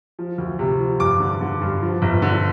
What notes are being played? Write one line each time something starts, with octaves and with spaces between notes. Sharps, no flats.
F3
D2
C3
F3
G2 D6
D3
D3
G2
F3
G1
D3